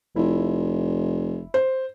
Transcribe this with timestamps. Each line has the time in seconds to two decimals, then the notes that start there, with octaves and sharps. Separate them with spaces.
0.16 F1 E4
1.54 C5